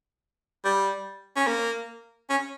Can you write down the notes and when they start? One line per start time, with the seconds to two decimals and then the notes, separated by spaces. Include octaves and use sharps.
0.65 G3
1.36 C#4
1.47 A#3
2.30 C#4